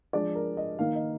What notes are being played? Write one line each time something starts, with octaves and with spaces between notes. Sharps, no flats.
F3 G#3 D4 D5
A#4
D#5
D#3 A#3 D#4 F5
D#5